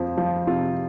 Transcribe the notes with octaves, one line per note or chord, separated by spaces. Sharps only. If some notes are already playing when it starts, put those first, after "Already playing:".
Already playing: F2 F3
F3
C3 F4